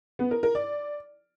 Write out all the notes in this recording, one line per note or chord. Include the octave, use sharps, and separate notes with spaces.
B3
A#4
A#4
D5